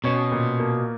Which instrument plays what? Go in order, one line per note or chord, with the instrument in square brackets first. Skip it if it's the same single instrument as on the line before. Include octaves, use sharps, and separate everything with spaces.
[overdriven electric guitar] B2 [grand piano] C#4
[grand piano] A#2
A#3